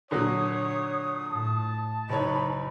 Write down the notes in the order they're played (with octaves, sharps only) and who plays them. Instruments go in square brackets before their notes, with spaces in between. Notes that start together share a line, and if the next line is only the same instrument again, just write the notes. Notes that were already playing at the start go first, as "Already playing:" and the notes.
[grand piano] A#2 D3 F#3 [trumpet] C#5 [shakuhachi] D#6
[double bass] A2 [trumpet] A5
[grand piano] F#1 C#5 [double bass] D#4 [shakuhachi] B5